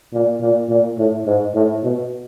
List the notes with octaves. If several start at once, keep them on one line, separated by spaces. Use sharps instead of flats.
A#2
A#2
A#2
A2
G#2
A2
B2